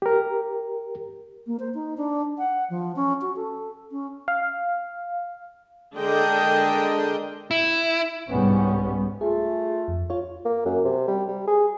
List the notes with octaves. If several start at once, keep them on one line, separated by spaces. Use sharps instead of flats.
G4 A#4
A#3
C5
D#4
D4
F#5
F3
C#4
F#4
A4
C#4
F5
D3 G#3 D4 A#4 D#5 G5
E4
C2 G#2 G3 B3 C#4
A3 F4 G#4
F2
F4 C#5
A#3
F#2
C3
G3
G3
G#4